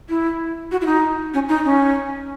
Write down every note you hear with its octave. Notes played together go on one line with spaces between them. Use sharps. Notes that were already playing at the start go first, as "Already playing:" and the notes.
E4
F#4
E4
D#4
C#4
D#4
C#4